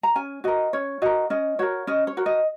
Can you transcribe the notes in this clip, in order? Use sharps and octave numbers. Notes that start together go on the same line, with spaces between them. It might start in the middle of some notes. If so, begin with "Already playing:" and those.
A#5
C#4 G#5
F#4 A#4 D#5
C#4 C#5
F#4 A#4 D#5
C#4 D#5
F#4 A#4 C#5
C#4 D#5
C#5
F#4 A#4
D#5